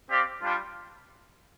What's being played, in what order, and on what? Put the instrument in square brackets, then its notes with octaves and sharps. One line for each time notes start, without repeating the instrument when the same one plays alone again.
[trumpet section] C4 G4 D5 F5
G3 D4 F4